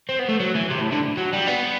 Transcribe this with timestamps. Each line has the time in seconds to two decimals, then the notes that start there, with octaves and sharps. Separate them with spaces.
0.09 C4
0.19 B3
0.28 A3
0.39 F#3
0.55 E3
0.70 C3
0.81 A2
0.92 D3
1.18 F#3
1.33 G3
1.48 B3